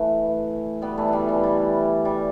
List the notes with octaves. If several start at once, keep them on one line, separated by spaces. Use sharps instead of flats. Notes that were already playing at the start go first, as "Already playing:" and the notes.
Already playing: E3 A3
G3 B3
E3 A3
E3 G3
E3
G3
G3